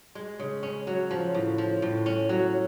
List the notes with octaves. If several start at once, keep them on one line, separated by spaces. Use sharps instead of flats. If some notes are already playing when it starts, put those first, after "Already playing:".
G#3
C#3
C#4
F#3
F3
A2
F3
A2
C#4
F#3